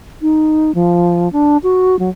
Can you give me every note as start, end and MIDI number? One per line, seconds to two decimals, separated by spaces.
0.22 0.74 63
0.75 1.31 53
1.32 1.57 62
1.63 1.99 66
1.99 2.09 54